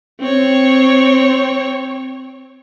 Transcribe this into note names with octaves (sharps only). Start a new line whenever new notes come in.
C4 C#5